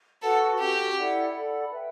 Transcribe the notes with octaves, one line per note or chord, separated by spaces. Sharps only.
F#4 A4 B4 F#5 A5
C#4 F#4 G4 A4
E4 A4 D5 F#5
A4 D5 F#5 B5
B4 E5 G5